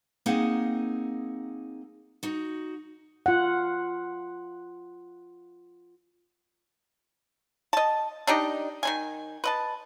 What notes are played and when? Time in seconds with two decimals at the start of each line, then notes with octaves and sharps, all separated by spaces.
0.26 A#3 C4 D#4 G#4 F#5
2.23 D#4 F#4
3.26 F4 F#5
7.73 D#5 A5
8.27 D4 D#4 G4 D#5
8.83 D#3 D4 G#5
9.44 B4 D#5 A5